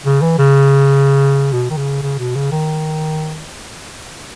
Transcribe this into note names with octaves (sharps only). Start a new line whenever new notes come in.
C#3
E3
C#3
B2
D#3
C#3
C#3
B2
C#3
D#3